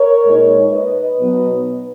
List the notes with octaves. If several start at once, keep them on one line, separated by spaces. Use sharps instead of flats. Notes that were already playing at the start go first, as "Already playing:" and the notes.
Already playing: A#4 C#5
A#2 G#3 D#4
B4 D#5
B2 F#3 B3 D#4